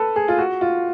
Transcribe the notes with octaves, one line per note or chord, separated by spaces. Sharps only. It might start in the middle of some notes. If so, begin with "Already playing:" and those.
Already playing: A4 B4
G#4
F4
F#4
F4